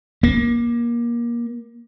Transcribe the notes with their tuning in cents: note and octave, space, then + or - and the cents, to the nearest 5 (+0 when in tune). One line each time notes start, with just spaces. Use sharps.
A#3 +25